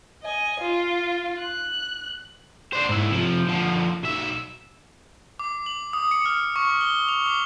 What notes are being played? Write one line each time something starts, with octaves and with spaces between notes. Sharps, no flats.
D#5 G#5
F4
F#6
D4 C5
G#2 E4
C3 F3
D3 F3
B1 E5
D6
F#7
D#6
C#7
F6
C#6
G7
F7
D6